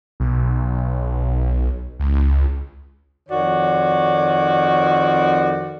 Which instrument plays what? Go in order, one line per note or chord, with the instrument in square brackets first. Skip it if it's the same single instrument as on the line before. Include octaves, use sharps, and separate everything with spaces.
[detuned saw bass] B1
C#2
[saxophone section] F2 D#3 F#4 C#5 D5